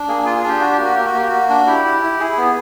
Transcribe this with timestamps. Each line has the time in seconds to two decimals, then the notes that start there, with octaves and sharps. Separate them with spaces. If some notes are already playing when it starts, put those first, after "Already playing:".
Already playing: D4
0.08 A#3 G#4
0.22 F4 G#4
0.35 G#4
0.44 D4 G4
0.61 F#4
0.72 G4
0.79 A#3 F#4
0.95 A#3 G4
1.06 F#4
1.14 A#3 G4
1.28 A#3 F#4
1.49 D4
1.67 E4 G4
1.84 E4
2.02 E4
2.20 E4 G#4
2.38 B3